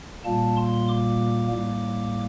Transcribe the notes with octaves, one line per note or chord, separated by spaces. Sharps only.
A#2 G3 A#3 A5
C6
D6
A2 G3 A#3